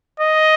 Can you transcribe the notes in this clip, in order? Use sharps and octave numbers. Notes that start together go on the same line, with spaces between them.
D#5